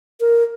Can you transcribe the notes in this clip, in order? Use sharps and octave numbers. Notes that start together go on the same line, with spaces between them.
A#4